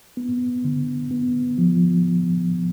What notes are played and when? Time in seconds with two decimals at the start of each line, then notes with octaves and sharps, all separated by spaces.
0.17 B3
0.65 D3
1.11 B3
1.58 F3